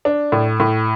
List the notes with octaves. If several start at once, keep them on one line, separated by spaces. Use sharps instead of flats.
D4
A2
A2